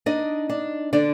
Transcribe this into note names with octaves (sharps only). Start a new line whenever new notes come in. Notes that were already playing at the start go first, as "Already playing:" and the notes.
D4 D#4 D#5
D4
D3 D4 D5